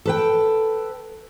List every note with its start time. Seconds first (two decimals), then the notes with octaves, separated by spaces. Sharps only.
0.06 A4 B4 G5